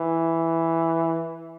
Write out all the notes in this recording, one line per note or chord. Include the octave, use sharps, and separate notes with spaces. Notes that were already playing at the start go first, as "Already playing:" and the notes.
Already playing: E3